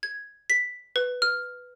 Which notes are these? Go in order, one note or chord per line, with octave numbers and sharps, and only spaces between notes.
G#6
B6
B4
F6